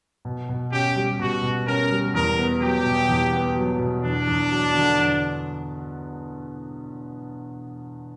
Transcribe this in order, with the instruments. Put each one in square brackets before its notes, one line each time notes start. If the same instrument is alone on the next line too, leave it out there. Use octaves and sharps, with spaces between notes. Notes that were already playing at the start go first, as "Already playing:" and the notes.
[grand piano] B2
B2
[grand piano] C#4 [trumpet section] G4
[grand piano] G3
[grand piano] B2 [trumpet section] F#4
[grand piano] B2
[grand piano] C#4 [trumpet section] A#4
[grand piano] G3
[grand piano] E2 [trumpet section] A#4
[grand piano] B3
[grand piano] F#3 [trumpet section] G4
[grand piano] B2
E2
B3
F#3
B2
[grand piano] E2 [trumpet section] D4
[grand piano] E2
F#3
D3
E2